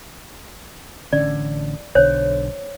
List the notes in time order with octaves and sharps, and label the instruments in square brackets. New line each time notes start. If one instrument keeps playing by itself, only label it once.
[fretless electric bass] A1 D3 C#4 [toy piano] D5
[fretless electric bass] B1 D3 [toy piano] C5 C#5